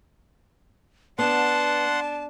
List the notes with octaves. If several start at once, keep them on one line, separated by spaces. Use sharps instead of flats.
B3 D4 F#5 A5 C6